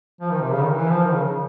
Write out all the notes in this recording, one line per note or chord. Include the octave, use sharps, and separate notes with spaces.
F3
D#3
C3
C#3
D#3
E3
F3
D#3
C#3
C#3